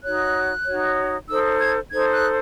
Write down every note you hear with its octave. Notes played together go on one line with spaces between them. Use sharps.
D#4 F#4 C#5 F#6
D#4 F#4 C#5
D#4 A4 C5 E6
G#6
D#4 A4 C5 G#6
F#6